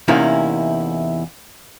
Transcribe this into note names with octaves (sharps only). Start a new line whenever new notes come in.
E2 C3 A#3 C#4 D#4 E4